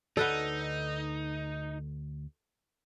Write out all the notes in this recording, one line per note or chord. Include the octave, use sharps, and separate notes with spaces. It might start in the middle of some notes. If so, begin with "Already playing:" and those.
D2 D#4 A4 B4 C#5 D5 F#5